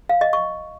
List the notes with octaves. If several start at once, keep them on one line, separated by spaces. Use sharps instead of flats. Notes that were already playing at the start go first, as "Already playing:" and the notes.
F5
D#5
C#6